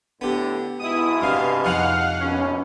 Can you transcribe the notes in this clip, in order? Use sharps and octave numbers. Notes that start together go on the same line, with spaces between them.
A2 D3 B3 G4
G#2 B2 E4 D#6
G2 C3 F5
C2 F2 D#4 F5 F#5 F6
A#1 B2 C#4